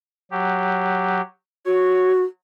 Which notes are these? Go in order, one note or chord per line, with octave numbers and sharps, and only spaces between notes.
F#3 G4
F#4 C#5